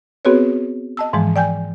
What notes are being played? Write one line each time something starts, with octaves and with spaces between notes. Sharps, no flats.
B3 C4 F#4 G#4 B4 C#5
D#5 A5 E6
G#2 E3 F3 G#3
D5 G5 G#5 G6